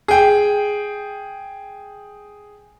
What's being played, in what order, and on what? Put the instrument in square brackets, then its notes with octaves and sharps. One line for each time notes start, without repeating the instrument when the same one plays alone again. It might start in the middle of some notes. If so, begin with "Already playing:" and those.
[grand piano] G#4 G5